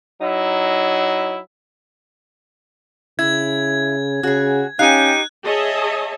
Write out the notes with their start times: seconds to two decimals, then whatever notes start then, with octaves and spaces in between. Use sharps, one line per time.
0.22 F#3 D#4 E4
3.19 C#3 E4 G#6
4.23 C#3 F#4 G#4
4.79 C#4 D#4 G4 F5 G5 G#5 F#6
5.45 G#4 C#5 D#5 E5 A5